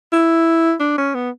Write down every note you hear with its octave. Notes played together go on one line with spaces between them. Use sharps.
E4
D4
C#4
B3